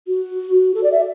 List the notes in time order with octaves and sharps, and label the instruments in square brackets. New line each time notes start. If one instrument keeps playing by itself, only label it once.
[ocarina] F#4
A4
D5
E5